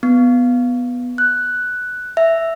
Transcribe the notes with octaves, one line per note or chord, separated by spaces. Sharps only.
B3
F#6
E5